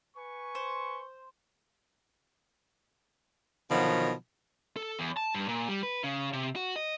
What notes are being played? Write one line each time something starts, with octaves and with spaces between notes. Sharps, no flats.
B4 G#5 C#6
C5
B2 D3 D#3 F3 F#3
A4
E2
A5
G2
A#2
G3
B4
C#3
C3
F#4
D#5